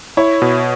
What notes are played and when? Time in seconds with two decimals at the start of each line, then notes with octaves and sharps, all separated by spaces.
0.17 E4 C#5
0.42 B2